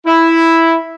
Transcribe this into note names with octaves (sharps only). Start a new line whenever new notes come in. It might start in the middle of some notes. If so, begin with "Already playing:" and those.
E4